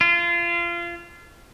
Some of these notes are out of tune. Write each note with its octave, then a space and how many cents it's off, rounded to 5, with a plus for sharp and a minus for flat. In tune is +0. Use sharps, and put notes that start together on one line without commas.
F4 -25